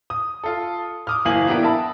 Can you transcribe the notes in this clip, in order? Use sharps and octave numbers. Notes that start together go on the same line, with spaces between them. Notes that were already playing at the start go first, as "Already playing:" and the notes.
D#6
F4 A4
D6 D#6 F6
F#1 E3 A#3 F5 G#5 F#7
E3 B3 D4 G4 A#4
A#4 E5 A5 B5